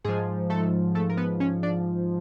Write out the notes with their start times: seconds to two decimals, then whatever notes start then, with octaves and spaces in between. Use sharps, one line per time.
0.04 G#2 F3 G#3 G#4
0.50 A3 A4
0.95 A3 A4
1.10 A#4
1.17 B3 B4
1.40 C#4 C#5
1.63 D4 D5